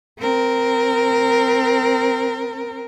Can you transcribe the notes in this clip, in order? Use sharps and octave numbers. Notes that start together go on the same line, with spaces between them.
C4 A#4